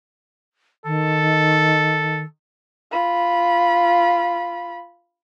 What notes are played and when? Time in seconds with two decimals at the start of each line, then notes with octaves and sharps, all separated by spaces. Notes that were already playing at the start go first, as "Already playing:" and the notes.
0.86 D#3 A4
2.92 F4 B5